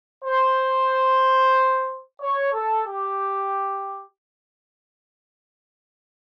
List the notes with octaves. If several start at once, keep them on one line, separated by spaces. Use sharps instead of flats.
C5
C#5
A4
G4